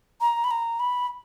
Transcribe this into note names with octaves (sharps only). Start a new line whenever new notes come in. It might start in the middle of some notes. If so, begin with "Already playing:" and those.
A#5
B5
A#5
B5